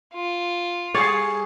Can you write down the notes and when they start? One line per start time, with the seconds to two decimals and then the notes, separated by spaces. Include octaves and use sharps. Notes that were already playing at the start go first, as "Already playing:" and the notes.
0.14 F4
0.94 G3 G#4 C#5 D5